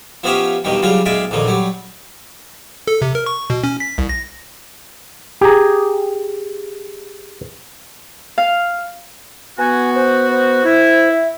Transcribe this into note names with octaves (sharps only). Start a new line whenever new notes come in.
F3 B3 C#4 F4 G4 E5
G2 B2 D#3 G3
C#3 F#3 G3 F4
B1 G#3 D5 E5 F5
A#1 F2 D3 D#3
F#3 G3
A4
C3
A#4
C#6
B2
C#4
B6
C2
A#6
G4 G#4 A#5
F5
B3 F#4 G#5
C5
C5
E4
E5